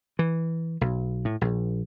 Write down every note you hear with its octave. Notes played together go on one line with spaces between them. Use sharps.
E3
B1
A2
A#1